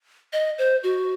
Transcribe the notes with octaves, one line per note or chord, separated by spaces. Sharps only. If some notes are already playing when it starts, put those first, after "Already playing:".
D#5
C5
F#4